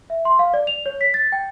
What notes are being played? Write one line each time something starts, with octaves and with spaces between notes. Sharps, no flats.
E5
C6
F5
D5
F7
C#5
B6
A6
G5